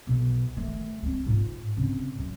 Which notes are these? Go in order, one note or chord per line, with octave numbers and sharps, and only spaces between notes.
B1
D#3 A3
G#3 C4
G#2 F4
G#1 C#3
F#2